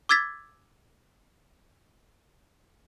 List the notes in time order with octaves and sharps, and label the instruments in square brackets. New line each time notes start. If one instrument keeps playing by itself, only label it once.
[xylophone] D6 E6 G#6 A6 B6